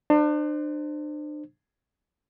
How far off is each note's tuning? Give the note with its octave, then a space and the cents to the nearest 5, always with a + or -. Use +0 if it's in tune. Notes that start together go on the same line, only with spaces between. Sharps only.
D4 +35 C5 +0